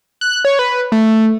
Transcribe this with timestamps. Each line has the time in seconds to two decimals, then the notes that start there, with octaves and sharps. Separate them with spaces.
0.21 F#6
0.45 C#5
0.59 B4
0.92 A3